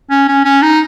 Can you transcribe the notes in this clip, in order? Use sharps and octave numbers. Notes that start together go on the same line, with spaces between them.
C#4
C#4
C#4
D#4